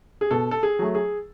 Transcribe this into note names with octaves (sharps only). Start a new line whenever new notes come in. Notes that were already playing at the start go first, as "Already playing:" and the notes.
G#4
B2 A4
A4
G#4
F#3 A3
G#4